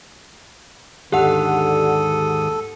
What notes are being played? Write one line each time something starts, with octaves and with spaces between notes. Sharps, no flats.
D#2 G#2 D3 G4 A4 F#5 D#6